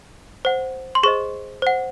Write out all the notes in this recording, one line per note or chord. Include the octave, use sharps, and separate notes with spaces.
C5 F#5
C6
G#4 C5 D#5 C#6
C5 F#5